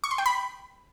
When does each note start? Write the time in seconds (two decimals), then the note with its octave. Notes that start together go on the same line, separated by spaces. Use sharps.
0.04 C#6
0.11 C6
0.18 G5
0.26 B5